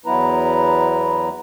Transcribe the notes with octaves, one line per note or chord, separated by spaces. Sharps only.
E2 F#3 B3 E4 B4 A#5